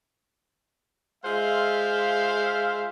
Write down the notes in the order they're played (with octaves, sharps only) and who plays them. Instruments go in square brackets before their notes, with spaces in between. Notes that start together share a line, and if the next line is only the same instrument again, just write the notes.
[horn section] G#3 F4 C5 E5 F5